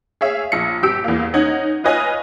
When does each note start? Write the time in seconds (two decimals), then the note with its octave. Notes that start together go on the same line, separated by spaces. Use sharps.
0.21 G#4 C#5 E5 F5
0.52 A#1 C#7
0.82 G1 G4 E6 D7
1.04 E2 A#3
1.33 C#4 D#4 F#5 G#6
1.84 F4 B4 C#5 D#5 G#5